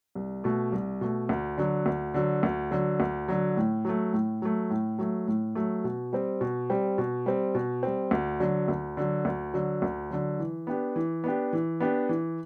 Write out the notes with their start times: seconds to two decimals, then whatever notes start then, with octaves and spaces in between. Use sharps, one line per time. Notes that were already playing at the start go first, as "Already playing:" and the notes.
0.15 C2
0.44 B2 A3
0.72 C2
1.01 B2 A3
1.29 D2
1.58 D3 F#3
1.86 D2
2.14 D3 F#3
2.43 D2
2.71 D3 F#3
3.00 D2
3.28 D3 F#3
3.57 A2
3.85 F#3 A3
4.13 A2
4.42 F#3 A3
4.70 A2
4.99 F#3 A3
5.27 A2
5.55 F#3 A3
5.84 B2
6.13 G3 C4
6.41 B2
6.70 G3 C4
6.98 B2
7.26 G3 C4
7.55 B2
7.83 G3 C4
8.11 D2
8.40 D3 F#3
8.68 D2
8.97 D3 F#3
9.25 D2
9.54 D3 F#3
9.82 D2
10.11 D3 F#3
10.39 E3
10.67 B3 D4 G4
10.96 E3
11.24 B3 D4 G4
11.53 E3
11.80 B3 D4 G4
12.09 E3